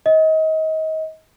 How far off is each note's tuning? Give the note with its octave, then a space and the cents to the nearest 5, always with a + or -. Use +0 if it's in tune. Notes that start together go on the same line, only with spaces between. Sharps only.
D#5 +30